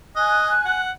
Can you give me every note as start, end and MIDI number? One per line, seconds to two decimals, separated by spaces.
0.16 0.52 75
0.16 0.81 80
0.16 0.81 90
0.65 0.92 78